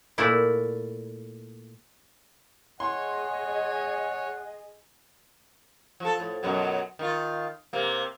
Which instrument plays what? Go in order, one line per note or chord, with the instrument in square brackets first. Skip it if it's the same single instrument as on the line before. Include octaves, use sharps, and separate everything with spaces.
[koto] A#2 A3 E4 D5
[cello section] G#4 D#5 [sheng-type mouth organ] C#5 G#5 [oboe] F#5 [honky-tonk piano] C6
[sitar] F3 A4
A2
F#2 B2 F#3
D#3 F4
C3 A#3